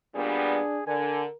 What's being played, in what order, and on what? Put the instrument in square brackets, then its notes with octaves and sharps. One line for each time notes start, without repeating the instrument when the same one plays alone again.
[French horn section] A#2 G3 B3 [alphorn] D4 [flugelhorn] G#4
[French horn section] D3 [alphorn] A#4 [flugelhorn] G#5